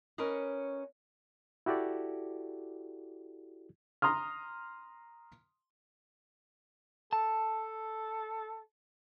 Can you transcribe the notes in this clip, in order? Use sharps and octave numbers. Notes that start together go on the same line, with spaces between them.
C#4 A#4 B4 C#5 D#5
E4 F#4 G4 A4 D5
A#5 C6 D#6 F6
A4 A5